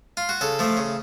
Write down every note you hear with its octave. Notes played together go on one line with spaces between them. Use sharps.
F4
F#4
C#3 A4
F3 A3
C#3